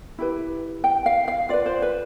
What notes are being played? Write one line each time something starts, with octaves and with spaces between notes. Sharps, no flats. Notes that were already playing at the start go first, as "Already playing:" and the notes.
E4 G4 B4
G5
F5
F5
F4 B4 D5
C5
B4